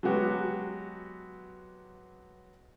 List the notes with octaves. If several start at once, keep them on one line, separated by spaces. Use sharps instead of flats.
F#3 G#3 B3 F#4 G4